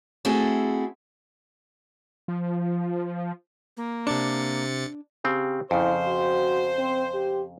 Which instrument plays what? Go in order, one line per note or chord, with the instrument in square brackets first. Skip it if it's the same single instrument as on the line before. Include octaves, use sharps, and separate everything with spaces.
[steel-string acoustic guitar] A3 C4 E4 F#4 G#4 A4
[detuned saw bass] F3
[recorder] A#3
[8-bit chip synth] C3 A6 C#7 [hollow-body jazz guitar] D4
[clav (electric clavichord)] C#3 C4 [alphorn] G4
[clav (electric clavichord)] F2 C#3 [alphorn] E4 [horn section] C5
[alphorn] F#4
C4
G4